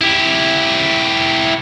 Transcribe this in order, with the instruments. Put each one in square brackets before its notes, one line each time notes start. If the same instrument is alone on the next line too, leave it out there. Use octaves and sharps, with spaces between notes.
[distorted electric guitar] E4 G4